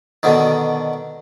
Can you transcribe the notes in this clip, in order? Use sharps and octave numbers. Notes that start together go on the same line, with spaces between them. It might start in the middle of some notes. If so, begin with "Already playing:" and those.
B2 D3 D#3